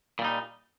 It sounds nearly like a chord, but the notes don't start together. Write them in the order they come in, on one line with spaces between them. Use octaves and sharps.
A#2 G3 D#4